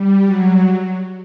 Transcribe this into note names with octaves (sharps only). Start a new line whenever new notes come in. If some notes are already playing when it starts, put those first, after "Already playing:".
Already playing: G3
F#3